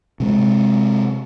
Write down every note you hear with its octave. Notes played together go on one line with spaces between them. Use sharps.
C3 G#3